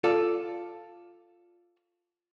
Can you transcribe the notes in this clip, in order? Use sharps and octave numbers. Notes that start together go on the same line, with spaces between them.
F4 A4 D5